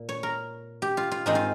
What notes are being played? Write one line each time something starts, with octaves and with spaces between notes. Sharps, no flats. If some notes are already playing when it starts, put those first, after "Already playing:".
Already playing: A#2
C#5
A#4
G4
F4
F4
G#2 D#3 G#3 C4 D#4 G#4
F4